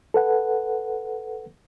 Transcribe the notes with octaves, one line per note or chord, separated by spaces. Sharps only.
A4 B4 F#5